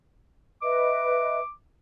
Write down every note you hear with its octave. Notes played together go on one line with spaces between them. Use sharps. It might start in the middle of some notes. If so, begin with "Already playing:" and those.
B4 D#5 E5 D6